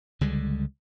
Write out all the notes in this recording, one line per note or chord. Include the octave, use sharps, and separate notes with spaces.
C#2 D3 G3 G#3